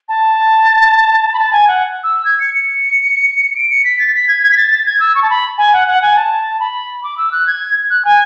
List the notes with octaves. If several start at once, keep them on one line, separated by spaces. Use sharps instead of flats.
A5
B5
A5
G#5
F#5
E6
G#6
C#7
C#7
D7
C#7
B6
A6
B6
G#6
G#6
B6
A6
A6
G#6
E6
C#6
A5
B5
G#5
F#5
F#5
G#5
A5
B5
D6
E6
F#6
G#6
F#6
G#5